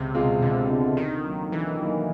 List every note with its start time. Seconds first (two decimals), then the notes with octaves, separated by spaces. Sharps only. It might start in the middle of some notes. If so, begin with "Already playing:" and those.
Already playing: C#2 C3
0.14 B2 G#3 C4 F4
0.42 C#2 D3
0.69 B2 G#3 C4 F4
0.96 D3 D#3
1.25 F#3 A#3
1.52 D3 E3
1.80 F#3 A#3